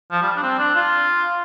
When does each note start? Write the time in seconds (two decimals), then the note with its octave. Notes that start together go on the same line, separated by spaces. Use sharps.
0.11 F3
0.22 G3
0.36 D4
0.43 C4
0.59 D4
0.75 F4